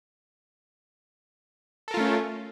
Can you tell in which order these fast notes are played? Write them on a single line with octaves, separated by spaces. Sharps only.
A4 A#4 F4 A3 C#4